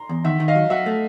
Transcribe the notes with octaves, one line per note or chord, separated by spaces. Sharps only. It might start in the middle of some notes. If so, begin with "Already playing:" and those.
Already playing: A#5 C6
E2
D#3 E5 F#5
D#3
D#5 F5
F#3
F#3 E5 F#5
A3